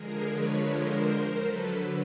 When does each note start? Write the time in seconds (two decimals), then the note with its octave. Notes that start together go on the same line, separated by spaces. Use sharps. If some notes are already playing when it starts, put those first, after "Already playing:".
Already playing: D3 F3 G#3 G#4 A#4
0.27 B4 C#5
0.63 A#4 C5
1.38 D3 F#3 A4 B4